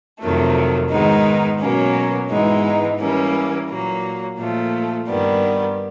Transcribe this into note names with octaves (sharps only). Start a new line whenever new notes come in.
F2 C3 D#3 F#3 A3
G#2 D#3 G#3 B3 D#4
B2 F#3 A#3 C#4
G#2 E3 G#3 B3 D#4
E3 G3 A#3 C#4
A#2 F#3 A#3
A#2 F3 A3
G2 D#3 G3 B3